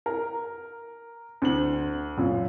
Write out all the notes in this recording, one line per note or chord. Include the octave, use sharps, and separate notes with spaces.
A#4
D2 F#7
F#2 A#2